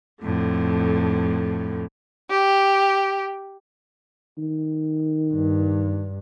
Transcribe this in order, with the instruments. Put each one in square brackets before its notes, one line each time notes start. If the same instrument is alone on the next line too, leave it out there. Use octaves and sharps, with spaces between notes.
[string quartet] F2 A2 D3
[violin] G4
[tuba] D#3
[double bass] G2